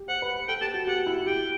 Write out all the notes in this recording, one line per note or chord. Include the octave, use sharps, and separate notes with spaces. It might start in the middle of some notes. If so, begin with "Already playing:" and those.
Already playing: G4
C5 F#5
B4
A4 G5
G4 A5
F#4
G4 F#5
E4
G4 G5